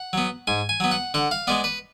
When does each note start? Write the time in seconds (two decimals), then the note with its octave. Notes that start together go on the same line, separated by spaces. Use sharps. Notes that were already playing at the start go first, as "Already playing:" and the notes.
Already playing: F#5
0.13 F#3 B3
0.47 G#2 G#5
0.69 G#5
0.80 F#3 B3
0.91 F#5
1.14 D3 F#5
1.31 F5
1.47 G#3 B3 D5
1.64 B4